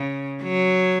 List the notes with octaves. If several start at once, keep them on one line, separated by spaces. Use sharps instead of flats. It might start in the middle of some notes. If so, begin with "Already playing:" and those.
Already playing: C#3
F#3